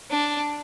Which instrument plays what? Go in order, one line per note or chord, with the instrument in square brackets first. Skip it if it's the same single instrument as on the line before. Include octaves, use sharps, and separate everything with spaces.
[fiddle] D4